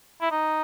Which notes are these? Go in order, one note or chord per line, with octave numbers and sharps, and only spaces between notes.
E4
D#4